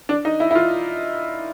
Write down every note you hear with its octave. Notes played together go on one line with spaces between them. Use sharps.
D4
D#4
E4
E4
F4